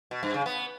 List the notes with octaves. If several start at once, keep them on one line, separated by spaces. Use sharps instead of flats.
B2
G2
C#3
B3